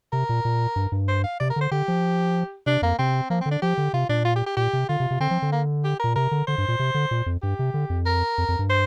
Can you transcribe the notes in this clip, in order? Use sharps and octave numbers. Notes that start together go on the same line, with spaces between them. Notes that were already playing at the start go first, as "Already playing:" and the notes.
C3 A#4
A#2
A#2
G2
G2
C5
F5
C3 D5
A#4
D3 C5
D3 G4
F3
C3 D4
F2 A#3
C3 C4
F3 A#3
C4
D3
D4
F3 G4
D3
C3 F4
A#2 D4
F4
G4
G4
A#2 G4
C3
D3 F4
C3
C3
D3 C4
F3
D3
A#3
G4
A#2 A#4
C3 A#4
D3
D3 C5
G2
A#2
C3
D3
A#2
F2
G2 G4
C3
D3
F2
A#4
F2
F2
G2
C5